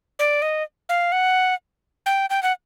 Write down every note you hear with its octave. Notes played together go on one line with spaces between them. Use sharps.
D5
D#5
F5
F#5
G5
G5
F#5